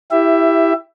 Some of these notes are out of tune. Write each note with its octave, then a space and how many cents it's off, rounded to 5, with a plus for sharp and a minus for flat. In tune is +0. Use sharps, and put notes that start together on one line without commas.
E4 +0 G4 +5 E5 +15